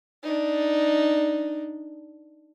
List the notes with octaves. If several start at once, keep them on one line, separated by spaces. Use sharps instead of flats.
D4 D#4